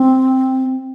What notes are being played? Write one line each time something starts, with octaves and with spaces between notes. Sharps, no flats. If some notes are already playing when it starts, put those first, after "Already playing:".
Already playing: C4